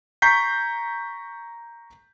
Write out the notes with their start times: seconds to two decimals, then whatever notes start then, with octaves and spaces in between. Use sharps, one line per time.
0.22 A#5 C#6 G6 B6 C7